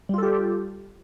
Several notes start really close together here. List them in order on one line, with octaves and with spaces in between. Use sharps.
G3 F4 A4 G4